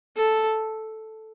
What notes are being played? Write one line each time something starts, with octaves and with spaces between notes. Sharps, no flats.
A4